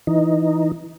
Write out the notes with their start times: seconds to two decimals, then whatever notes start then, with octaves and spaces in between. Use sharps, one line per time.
0.07 E3 D#4